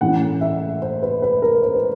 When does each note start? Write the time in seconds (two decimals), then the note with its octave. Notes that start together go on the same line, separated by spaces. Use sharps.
0.01 A2 E3 A3 C#4 F#5
0.41 E5
0.82 C5
1.02 B4
1.22 B4
1.42 A#4
1.62 C5
1.75 B4